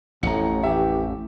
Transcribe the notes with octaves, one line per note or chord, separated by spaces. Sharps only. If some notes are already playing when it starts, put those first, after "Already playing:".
A1 F2 A2 A#5 C#7
E3 G4 E5